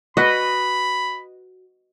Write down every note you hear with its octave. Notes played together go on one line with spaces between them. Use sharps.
F#4 B4 D#5 B5